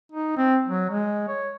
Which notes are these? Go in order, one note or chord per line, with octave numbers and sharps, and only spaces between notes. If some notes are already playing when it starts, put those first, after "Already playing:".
D#4
C4
F#3
G#3
C#5